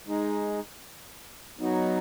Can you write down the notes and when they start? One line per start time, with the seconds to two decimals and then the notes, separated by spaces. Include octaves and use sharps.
0.07 G#3 D#4 G#4
1.59 F#3 B3 D#4 F#4